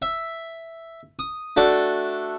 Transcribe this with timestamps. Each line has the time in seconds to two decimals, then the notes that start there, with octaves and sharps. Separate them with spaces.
0.02 E5
1.19 D#6
1.57 A3 D4 F#4 A4